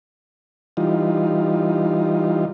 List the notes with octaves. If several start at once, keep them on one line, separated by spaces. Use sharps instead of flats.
E3 G3 D#4 F4